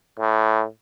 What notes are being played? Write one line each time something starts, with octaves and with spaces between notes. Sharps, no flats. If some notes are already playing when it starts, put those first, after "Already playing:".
A2